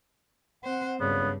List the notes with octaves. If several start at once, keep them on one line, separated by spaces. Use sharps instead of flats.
C4 C5 F#5
F#1 C#2 G2 C#3 B3 D5